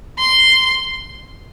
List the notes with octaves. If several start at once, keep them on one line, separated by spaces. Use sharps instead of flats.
C6